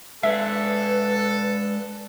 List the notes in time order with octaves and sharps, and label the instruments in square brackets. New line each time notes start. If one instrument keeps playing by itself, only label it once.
[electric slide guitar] G#3 D4 G#4 [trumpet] A4 [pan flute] B4 [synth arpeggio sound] E5